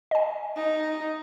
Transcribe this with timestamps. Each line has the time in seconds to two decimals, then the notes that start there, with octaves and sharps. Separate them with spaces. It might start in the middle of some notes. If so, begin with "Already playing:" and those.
0.11 D#5 G#5
0.56 D#4